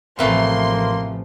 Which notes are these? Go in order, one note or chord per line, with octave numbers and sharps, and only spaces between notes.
A1 C3 E3 F3 A3 A#3 C6